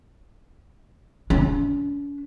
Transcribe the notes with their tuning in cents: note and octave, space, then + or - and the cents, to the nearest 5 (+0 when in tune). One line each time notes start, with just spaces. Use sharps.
C#4 +45